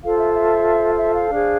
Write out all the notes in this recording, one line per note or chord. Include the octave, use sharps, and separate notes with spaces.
F4 A4 C5 F5
E5
E5
E5
F5
D4 G#4 C5